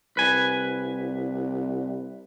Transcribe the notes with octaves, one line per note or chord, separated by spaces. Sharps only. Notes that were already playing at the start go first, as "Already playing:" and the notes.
C2 B4 G#5